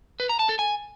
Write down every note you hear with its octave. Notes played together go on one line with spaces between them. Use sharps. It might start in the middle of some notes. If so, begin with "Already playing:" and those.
B4
A#5
A5
A4
G#5